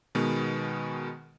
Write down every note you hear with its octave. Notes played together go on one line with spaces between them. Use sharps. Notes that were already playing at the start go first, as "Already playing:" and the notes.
B2 D#3 G#3 B3